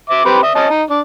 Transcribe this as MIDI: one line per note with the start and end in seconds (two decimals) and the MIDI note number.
0.10 0.23 76
0.10 0.23 86
0.25 0.39 60
0.25 0.39 67
0.25 0.39 71
0.43 0.50 76
0.43 0.50 87
0.55 0.69 61
0.55 0.69 75
0.55 0.69 81
0.70 0.83 63
0.90 1.00 62